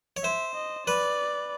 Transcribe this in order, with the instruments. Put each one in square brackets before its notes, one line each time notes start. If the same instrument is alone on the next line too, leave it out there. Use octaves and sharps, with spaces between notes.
[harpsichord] C#5
[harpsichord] C5 [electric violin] E5
[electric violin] D#5
[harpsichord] B4 [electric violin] D5